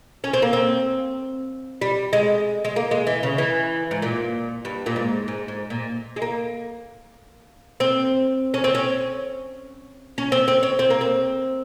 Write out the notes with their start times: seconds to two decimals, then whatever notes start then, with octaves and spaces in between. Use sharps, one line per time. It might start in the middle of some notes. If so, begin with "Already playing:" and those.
0.24 C#4
0.33 C4
0.42 A#3
0.53 C4
1.81 G3
2.13 G#3
2.65 G#3
2.76 A#3
2.91 G#3
3.07 E3
3.23 C#3
3.38 E3
3.91 G#2
4.02 A#2
4.65 G2
4.86 A#2
4.96 G#2
5.28 G#2
5.48 G#2
5.70 A#2
6.16 G#3
6.22 A#3
7.80 C4
8.54 C#4
8.64 C4
8.75 C#4
10.18 C#4
10.32 C4
10.48 C4
10.63 C#4
10.79 C4
10.90 A#3
11.01 C4